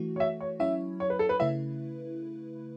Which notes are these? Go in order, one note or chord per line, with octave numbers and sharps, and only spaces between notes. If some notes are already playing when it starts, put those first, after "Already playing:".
Already playing: E3 A3 F#4
C#5
E5
C#5
F#3 C#4 E4 C#5 E5
C#5
B4
A4
B4
C#3 A3 E4 B4 E5